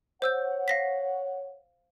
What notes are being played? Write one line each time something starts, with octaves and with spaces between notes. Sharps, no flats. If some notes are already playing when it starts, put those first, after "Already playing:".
C5 C#5 F#5 E6 G6
F5 A#6 B6